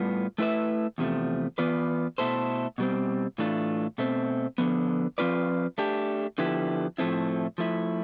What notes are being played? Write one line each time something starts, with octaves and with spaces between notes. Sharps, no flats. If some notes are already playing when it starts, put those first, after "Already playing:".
Already playing: A2 G3 B3 F4
A3 E4 B4 E5
E2 C3 F3 A3
E3 B3 F4 B4 D5
B2 A3 E4 A4 C5
B2 G3 C4
A2 E3 A3 D4 F4
B2 A3 C4
D3 F3 B3
F3 C4 F4 B4 D5
A3 D4 G4
D3 F3 B3 E4 G4
A2 F3 A3 C4 E4
F3 A3 E4